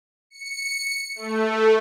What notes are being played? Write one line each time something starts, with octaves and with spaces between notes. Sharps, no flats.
C#7
A3